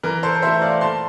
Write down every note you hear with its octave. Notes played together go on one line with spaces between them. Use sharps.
E3 A#4
A4 C5
A3 E4 C5 E5
D5 F5
A#2 A5 C6